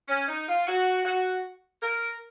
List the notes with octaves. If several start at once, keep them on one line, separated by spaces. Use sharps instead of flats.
C#4
D#4
F4
F#4
F#4
A#4